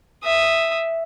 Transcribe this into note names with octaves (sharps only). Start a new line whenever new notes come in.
E5 D#6